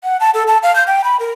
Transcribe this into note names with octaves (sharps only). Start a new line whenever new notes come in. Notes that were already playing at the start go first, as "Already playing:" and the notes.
F#5
A5
A4
A5
F5
G6
G5
B5
A#4